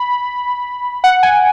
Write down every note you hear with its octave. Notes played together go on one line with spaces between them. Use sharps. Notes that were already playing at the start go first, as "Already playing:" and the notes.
Already playing: B5
F#5
G#5